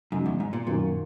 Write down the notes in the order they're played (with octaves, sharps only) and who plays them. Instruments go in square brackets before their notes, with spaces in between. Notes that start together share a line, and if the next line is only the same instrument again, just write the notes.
[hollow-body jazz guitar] F#2 [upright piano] C#3 G#3 D#4 F#4
[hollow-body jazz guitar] E2
G#2
A#2
[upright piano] F#2 D#3 A#3 D#4 [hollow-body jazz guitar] A#2